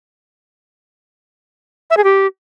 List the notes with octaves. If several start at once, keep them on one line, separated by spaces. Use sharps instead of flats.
E5
G#4
G4